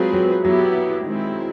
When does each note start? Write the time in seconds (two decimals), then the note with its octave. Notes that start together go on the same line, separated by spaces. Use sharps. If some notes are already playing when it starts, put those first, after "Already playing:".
Already playing: F#3 G#3 C4 F4 G#4 B4
0.13 F#3
0.44 F#3 B3 E4 G4
1.05 D#3 G#3 C4 E4